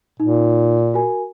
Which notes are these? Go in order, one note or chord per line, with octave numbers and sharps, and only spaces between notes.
A#2 D#4
F#4 A#4 G#5